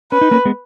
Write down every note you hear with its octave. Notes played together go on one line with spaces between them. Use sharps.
C#4 B4
D#4
A#3 C#4
G#3 B3